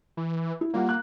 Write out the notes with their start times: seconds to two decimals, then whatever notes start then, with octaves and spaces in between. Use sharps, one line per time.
0.17 E3
0.61 E4
0.74 G3 A#3 F4 F#5
0.89 F#6